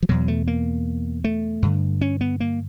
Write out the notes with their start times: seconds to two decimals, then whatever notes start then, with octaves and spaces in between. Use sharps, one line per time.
0.03 F3
0.09 E2 B2 F#3
0.28 A3
0.48 A#3
1.24 A3
1.62 G2 D3
2.01 C#4
2.21 B3
2.40 A#3